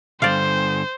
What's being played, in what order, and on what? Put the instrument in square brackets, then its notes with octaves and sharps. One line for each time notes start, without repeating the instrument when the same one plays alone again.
[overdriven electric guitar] G2 D3 [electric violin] C5 [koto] D5 F5